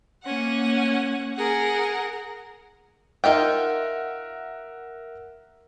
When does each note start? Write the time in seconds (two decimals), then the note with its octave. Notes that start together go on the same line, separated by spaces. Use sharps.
0.24 A#3 C#4 F#5
1.36 G#4 A#4 F#5
3.24 D#4 F4 A#4 E5 F#5 G5